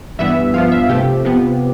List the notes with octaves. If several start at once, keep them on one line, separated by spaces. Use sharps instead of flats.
G2 E3 B3 E5
G2 F3 B3 F5
E5
C3 F3 A3 G4
C3 F3 B3